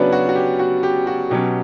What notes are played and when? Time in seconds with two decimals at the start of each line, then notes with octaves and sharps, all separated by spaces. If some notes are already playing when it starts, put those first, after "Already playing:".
Already playing: C#3 F#3 B3 C#4 D4 F#4 B4 D5
0.12 F#4
0.29 F#4
0.35 G4
0.59 F#4
0.83 G4
1.07 F#4
1.30 B2 F#3 C#4 G4